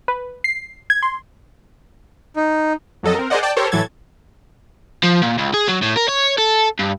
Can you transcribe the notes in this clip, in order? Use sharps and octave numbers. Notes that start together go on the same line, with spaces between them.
B4
C7
G#6
C6
D#4
F2 F#3 A4 D#5
C4 A#4
G#4 A#4 C5 D5 D#5 F#5
D5 G5 A5
G4 A4 A#4 C5 C#5
A2 E3 F#3 A4 G#6 A6
F3
A#2
C#2
G#4
F#3
A2
A#4
C#5
A4
G2